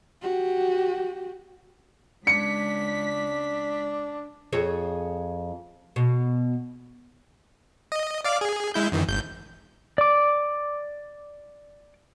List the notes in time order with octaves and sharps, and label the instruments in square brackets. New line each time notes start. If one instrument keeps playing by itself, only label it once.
[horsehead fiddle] F#4 G4
[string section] C#2 B6 [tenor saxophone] D4 [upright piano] C#7
[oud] F2 G#4 C#5
B2
[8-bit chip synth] D#5
D5 F5 D6
G#4
G#3 E4 G6
F#2 D#3 E3
G#1 G6
[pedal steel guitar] D5 D6